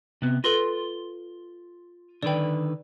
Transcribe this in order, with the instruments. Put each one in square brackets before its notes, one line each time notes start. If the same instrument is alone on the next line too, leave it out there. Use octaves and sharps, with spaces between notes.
[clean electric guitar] C3 B3
[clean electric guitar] F4 C6 [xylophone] A4 B4 A#6
[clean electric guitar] D3 D#3 B4 [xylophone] D5 G5